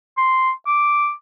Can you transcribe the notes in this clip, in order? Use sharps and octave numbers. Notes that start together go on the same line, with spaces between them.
C6
D6